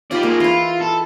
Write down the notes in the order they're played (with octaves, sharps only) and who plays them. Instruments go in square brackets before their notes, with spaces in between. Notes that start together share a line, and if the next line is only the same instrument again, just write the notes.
[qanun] D#4 F4 A#4 [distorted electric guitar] G4 D5
[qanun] G#3 [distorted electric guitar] A#3 G#4
[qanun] E3 E4 [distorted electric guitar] F4
[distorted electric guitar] A4